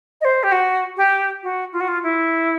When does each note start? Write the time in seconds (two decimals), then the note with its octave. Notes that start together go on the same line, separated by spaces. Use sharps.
0.21 D#5
0.25 C5
0.43 G4
0.52 F#4
0.97 G4
1.43 F#4
1.73 F4
1.80 F#4
1.88 F4
2.03 E4